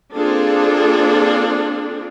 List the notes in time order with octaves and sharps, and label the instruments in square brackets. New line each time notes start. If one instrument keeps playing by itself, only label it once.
[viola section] A#3 C4 D4 F4 G#4 A4